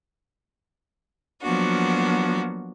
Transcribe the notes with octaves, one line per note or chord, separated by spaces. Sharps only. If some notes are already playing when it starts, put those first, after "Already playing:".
F3 F#3 A#3 B3 D4 F#4